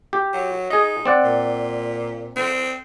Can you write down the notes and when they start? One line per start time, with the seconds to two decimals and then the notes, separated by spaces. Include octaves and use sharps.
0.13 G4
0.33 F#3
0.70 D#4 G#4 D#5
1.05 C4 D5 F#5
1.24 A#2
2.36 C4